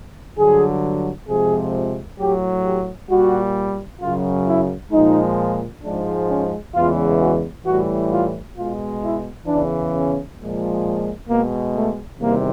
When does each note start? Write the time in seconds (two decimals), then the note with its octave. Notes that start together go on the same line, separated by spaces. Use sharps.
0.37 G2 D3 F#3 G#4
1.28 F2 C3 F3 G#3 G#4
2.19 A2 F#3 G4
2.64 G4
3.10 A#2 G3 F#4
4.01 F#2 C#3 F#3 F4
4.46 E4
4.92 A#2 F3 G#3 D#4
5.83 G#2 F3 G#3 D4
6.29 C#4
6.74 E2 C#3 E3 G#3 F4
7.20 F#4
7.65 A2 E3 G3 F#4
8.10 F4
8.56 B2 G#3 F4
9.02 E4
9.47 E2 C#3 E3 D4
9.92 C#4
10.38 A#2 F3 G#3
11.29 B2 G#3 A#3
11.74 A3
12.20 E2 C3 D#3 G3 A#3